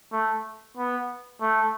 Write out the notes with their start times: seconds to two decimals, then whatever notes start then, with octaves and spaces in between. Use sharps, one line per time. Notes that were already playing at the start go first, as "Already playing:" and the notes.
0.12 A3
0.77 B3
1.41 A3